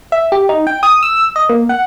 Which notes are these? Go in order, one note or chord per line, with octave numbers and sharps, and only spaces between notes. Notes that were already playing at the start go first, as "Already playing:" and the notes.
E5
G4
D#4
G5
D#6
E6
D#5
A#3
F#5